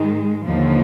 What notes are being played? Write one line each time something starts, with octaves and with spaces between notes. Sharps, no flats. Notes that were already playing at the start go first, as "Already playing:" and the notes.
Already playing: G#2 D#3 G#3
D#2 D3 F3